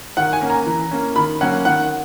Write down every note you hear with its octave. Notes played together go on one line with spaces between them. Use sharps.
D#3 F#5
G#5
A#3 C#4
A#5
E3
A#3 C#4
D#3 B5
F#3 A#3 C#4 F#5
D#3 F#5